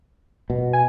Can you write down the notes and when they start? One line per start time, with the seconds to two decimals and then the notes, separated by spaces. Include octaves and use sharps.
0.50 B2
0.73 G#5